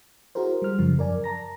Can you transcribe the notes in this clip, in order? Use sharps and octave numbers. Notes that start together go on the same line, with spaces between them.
E4 F#4 G#4 A#4 C5
G3 F6
F#2 C#3 F3
F#2 A#4 D5 G#5
A5 A#5 A#6